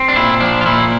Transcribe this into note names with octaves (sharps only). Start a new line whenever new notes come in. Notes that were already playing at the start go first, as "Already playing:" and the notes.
Already playing: C4
D4
A#2 E4
F3 D4
F4
A#2 E4